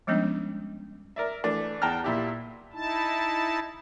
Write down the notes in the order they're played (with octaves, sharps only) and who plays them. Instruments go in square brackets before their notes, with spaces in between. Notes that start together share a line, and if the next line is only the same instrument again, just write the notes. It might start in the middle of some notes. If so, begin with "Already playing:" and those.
[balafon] F3 G3 G#3 B3 C#4 D4
[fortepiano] A#4 D5 E5
E3 A3 D4
E2 G5 A5 A#5 F6
A#2 E4 G4
[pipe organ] D#4 E4 A5